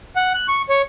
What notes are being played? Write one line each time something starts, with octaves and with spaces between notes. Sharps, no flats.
F#5
F#6
C#6
C#5